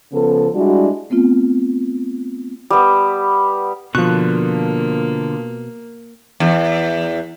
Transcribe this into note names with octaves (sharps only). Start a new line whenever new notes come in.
C#3 F3 B3 A4
G3 G#3 D4 E4 F#4
A3 B3 C4 F4
G3 B3
B2 D3 F3 A#3 F4 C#6 F#6
E2